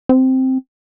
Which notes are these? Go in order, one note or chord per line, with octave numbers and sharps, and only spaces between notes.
C4